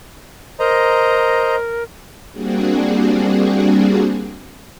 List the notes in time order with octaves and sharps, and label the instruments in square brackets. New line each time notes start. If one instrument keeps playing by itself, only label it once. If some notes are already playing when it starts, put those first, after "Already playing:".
[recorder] A#4 [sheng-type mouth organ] C5 D#5 A#5
[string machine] G3 A#3 C4 D4 F#4 G#4